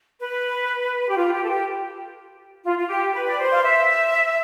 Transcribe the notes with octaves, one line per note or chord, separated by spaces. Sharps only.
B4
G4
F4
G4
A4
G4
F4
F4
G4
B4
D5
C5
F5
E5